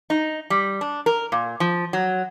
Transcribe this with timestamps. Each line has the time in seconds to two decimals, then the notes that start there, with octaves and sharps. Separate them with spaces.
0.10 D#4
0.50 G3
0.81 D4
1.06 A#4
1.32 A#2
1.60 F3
1.93 F#3